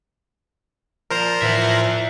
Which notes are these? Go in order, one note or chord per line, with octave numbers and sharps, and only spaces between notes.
A#2 F3 A#4 C5 A#5
A2 E3 F3 E5 F#5